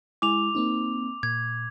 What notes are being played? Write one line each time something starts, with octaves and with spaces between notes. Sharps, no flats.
G#3 E4 G#5 D6 F7
A#3 C4 D#4
A#2 G#6